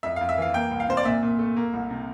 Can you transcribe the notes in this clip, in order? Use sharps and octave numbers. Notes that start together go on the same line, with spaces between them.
F2 E5
F5
F2
E5
E3 F5
A#3 G5
C2
F5
C3 C5
D5
A#2 E5
A#2
A3
A#3
C2
C3